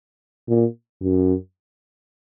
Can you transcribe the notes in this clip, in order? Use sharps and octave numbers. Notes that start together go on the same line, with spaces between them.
A#2
F#2